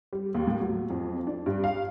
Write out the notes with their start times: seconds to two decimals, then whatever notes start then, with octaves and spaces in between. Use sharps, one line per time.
0.13 G3
0.34 D#2
0.47 A2
0.61 F#3
0.90 F2
1.27 D4
1.46 G2
1.64 F5